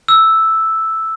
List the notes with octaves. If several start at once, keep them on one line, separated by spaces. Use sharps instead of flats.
E6